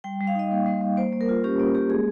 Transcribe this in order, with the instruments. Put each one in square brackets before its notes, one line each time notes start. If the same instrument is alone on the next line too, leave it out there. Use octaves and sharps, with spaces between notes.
[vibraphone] G3 G5
G3
F5
D#4 D#5
A#3
G3
G3
A#3 C5
A#3
A#4
F4
C#4 G4
A#3
A#3 G4
G#3 G#4